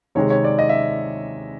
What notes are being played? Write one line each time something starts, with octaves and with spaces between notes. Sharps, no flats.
C3 D#3 G#3 C#5
C#5
D5
D#5
E5